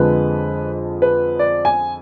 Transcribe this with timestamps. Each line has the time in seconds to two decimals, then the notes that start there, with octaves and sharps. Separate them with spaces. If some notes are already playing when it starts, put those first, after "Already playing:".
Already playing: F2 D3 G#3 B4
1.02 B4
1.39 D5
1.65 G#5